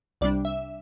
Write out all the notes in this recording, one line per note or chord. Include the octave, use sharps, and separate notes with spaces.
C2 C3 G3 D4 D5
E5